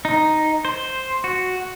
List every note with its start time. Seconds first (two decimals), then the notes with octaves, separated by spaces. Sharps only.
0.05 D#4
0.65 C5
1.24 F#4